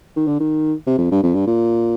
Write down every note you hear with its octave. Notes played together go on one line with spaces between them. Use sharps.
D#3
D3
D#3
C3
F2
G2
F2
G2
A#2